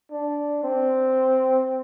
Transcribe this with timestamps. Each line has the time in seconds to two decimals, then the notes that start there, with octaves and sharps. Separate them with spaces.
0.11 D4
0.64 C4